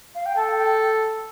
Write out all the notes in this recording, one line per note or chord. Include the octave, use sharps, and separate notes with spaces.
F5
G5
A4 A5
G5